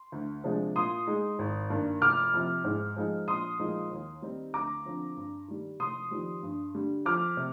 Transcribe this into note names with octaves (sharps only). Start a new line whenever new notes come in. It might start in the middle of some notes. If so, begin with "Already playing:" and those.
Already playing: C6
D2
C3 F3 G#3 D4
A#2 C6 D#6
G#3 D#4
G#1
G2 D#3 A#3 D4
F1 D6 F6
F2 C3
G#2
F3 G#3 D#4
A#1 C6 D#6
A#2 F3 G#3 D#4
D#2
D#3 G3 C4 D#4
D2 A#5 D6
D3 F3 C4
G2
D#3 G3
F1 C6 D#6
F2 D#3 G3
G2
D3 G3
F2 D6 F6
C3